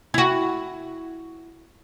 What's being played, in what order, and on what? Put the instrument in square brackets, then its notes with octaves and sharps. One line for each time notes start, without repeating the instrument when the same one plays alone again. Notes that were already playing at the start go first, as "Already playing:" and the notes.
[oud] E4 F#4